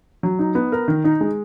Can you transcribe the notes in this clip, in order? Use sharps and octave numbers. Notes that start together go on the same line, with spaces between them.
F#3
D#4
B3
A#4
D#3
D#4
G#3